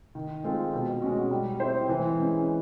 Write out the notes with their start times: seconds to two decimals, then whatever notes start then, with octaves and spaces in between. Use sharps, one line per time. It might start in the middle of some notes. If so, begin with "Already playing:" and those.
0.15 D#3
0.44 G#3 C4 F4 A4
0.74 B2
1.02 G#3 C#4 F#4
1.31 G3
1.60 C4 E4 A4 C5
1.89 E3
2.18 G#3 C#4